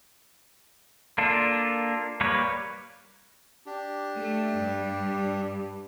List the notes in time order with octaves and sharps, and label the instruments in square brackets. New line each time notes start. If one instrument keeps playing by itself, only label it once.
[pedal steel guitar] A#3 D4 F4 A4
G3 A#3 B4 C#5
[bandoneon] D4 G4
[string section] A3
G2